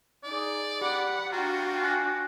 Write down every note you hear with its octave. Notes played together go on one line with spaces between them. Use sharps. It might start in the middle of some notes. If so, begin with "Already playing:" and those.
D#4 G#4 D5
G4 F#5 B5
D4 F4 F#4 G5 A#5
G#5 F#6 A#6